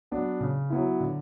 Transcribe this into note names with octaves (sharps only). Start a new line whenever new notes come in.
F#3 B3 D4
C#3
F#3 B3 E4
D3